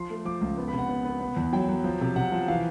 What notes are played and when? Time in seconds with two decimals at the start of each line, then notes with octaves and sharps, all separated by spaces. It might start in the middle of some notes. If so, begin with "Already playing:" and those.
Already playing: F3 C6
0.10 A3
0.25 F3 D6
0.41 C#2
0.58 B3
0.68 B5
0.73 C3
0.79 F#5
0.89 B3
1.05 B3
1.20 B3
1.36 E2
1.53 F#3 G5
1.69 F#3
1.84 F3
2.01 C3
2.16 C3 F#5
2.32 F3
2.48 E3 F5